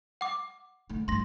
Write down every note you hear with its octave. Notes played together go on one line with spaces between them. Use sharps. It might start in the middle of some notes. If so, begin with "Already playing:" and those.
F#5 D6
D3 A3
G2 E3 C6 A#6